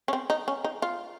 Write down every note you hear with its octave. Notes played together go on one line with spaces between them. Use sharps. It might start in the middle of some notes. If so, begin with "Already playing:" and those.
C#4
C4
D#4
C#4
D#4
F4